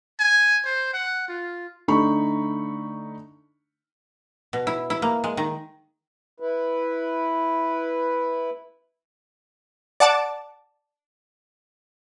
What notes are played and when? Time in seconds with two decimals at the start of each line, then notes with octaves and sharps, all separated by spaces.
0.19 G#5
0.65 C5
0.93 F#5
1.28 F4
1.88 D3 A3 D#4 B5 C#6
4.53 B2
4.67 E4
4.90 E4
5.02 A#3
5.24 G#3
5.37 D#3
6.40 E4 B4
10.00 D5 F#5 A5 D6